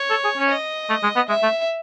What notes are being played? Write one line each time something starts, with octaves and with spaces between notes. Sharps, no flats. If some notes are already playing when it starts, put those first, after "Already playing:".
Already playing: C#5
A4
G#4
C#4
D#5
A3
G#3
B3
G#3 E5
A3